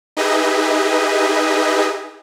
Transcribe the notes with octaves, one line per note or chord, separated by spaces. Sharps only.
D#4 G4 G#4 B4 D#5 E5